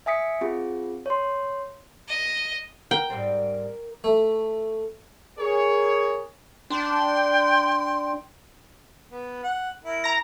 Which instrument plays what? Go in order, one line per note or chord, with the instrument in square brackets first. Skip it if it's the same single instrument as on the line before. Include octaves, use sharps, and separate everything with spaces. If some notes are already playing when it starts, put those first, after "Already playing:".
[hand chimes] E5 G#5 D#6 B6 C#7
C4 F4 G#4
C#5 C6
[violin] D#5
[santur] A#4 [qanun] G5
[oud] G#2 G3 C4
[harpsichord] A3
[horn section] G#4 A#4 C#5
[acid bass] D4 [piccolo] G5 [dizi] C6
[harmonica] B3
F#5
E4 A#4
[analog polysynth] A#5 A#6